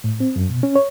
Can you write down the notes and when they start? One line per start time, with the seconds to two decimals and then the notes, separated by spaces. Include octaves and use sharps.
0.04 A2
0.20 C4
0.36 F#2
0.49 B2
0.63 C#4
0.75 C#5